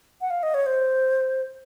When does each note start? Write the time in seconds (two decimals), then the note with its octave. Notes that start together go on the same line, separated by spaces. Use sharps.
0.21 F#5
0.30 F5
0.43 D#5
0.54 C#5
0.66 C5